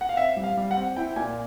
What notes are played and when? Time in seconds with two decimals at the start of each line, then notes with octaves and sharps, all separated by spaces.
0.01 F#5
0.09 F5
0.17 C4 E5
0.37 G3
0.44 F5
0.57 G3
0.71 F#5
0.77 C4
0.96 E4 G5
1.16 A#2 G#5